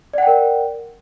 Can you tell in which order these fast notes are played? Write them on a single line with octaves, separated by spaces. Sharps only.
D5 F#5 G5 A#4